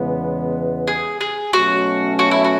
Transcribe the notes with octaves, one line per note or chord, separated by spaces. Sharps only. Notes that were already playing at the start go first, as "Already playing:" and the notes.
Already playing: E2 C#3 E3 G#3 B3
G#4
G#4
B2 F#3 A3 C#4 F#4
F#4
E4
F#4